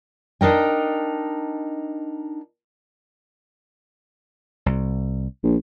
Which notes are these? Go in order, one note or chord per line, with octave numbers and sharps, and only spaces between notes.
D4 D#4 A#4 G5
C2
A#1